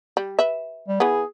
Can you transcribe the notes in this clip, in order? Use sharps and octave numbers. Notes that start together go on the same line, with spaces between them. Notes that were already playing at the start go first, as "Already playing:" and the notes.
G3
B4 E5
G3
E3 B3 G#4